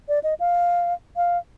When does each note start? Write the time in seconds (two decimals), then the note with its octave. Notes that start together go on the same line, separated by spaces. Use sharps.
0.09 D5
0.23 D#5
0.40 F5
1.16 F5